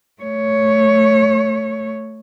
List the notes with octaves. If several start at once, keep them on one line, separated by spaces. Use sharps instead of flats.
A3 C#5